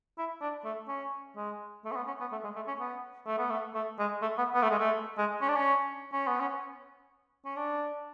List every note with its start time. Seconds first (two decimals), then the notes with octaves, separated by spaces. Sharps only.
0.18 E4
0.41 D4
0.64 A3
0.88 C#4
1.36 G#3
1.84 A3
1.91 C#4
1.96 B3
2.07 C#4
2.20 B3
2.32 A3
2.44 G#3
2.55 A3
2.67 C#4
2.80 B3
3.27 A3
3.38 B3
3.50 A3
3.74 A3
3.99 G#3
4.22 A3
4.38 B3
4.54 B3
4.62 A3
4.71 G#3
4.79 A3
5.18 G#3
5.41 C#4
5.48 D4
5.56 C#4
6.12 C#4
6.27 B3
6.40 C#4
7.45 C#4
7.56 D4